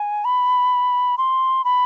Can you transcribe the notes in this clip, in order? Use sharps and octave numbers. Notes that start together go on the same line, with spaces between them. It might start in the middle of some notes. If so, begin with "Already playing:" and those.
Already playing: G#5
B5
C6
B5